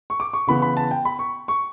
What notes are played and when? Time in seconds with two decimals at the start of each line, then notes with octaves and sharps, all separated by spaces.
0.10 C#6
0.20 D6
0.33 C#6
0.47 C#3 E3 B3 B5
0.62 B5
0.77 A5
0.91 G5
1.05 B5
1.19 C#6
1.48 C#6